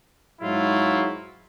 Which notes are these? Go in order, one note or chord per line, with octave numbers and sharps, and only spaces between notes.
G#2 F#3 G#3 E4 F4